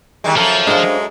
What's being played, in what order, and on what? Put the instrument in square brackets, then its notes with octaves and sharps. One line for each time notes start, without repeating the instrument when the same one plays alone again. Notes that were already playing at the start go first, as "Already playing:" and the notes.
[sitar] D#3 G3 G#3
[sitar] F#2 A4 [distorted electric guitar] F3
[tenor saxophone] G#3 [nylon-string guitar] D4 C5 F5